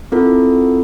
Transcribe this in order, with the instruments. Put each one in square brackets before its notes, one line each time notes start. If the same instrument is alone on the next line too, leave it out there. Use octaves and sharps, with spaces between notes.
[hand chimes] C4 E4 F4 A4 A#4